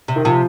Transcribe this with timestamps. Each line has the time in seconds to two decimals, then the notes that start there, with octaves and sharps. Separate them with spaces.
0.08 C3
0.16 D#3
0.25 C3 F3